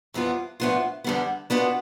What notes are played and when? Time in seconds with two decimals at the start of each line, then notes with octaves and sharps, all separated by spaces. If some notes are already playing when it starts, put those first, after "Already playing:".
0.14 F2 E3 G3 B3 F4
0.60 A2 F3 B3 D4 F4
1.04 E2 D3 G3 B3
1.50 B2 B3 D4 F4